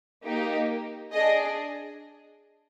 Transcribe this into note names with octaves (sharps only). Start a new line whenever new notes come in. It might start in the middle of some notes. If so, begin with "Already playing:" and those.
A#3 D#4 G4
D4 G#4 D#5